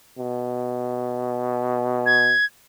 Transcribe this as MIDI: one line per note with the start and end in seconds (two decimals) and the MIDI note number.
0.19 2.34 47
2.06 2.45 92